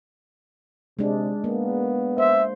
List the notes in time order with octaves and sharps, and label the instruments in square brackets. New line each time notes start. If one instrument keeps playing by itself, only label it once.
[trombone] C3 [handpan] G#3 D4
[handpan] A#3 [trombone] B3
[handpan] C5 [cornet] E5